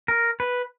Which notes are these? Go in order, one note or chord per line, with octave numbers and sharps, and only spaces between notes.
A#4
B4